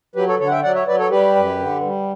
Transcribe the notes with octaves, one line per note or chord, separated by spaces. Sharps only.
F#3 G4 B4
A4 C#5
D3 A4 C#5
F#5
E5 G5
F#3 D5 F#5
C#5 E5
F#3 B4 D5
A4 C#5
G3 G4 B4
F#2
D3
G3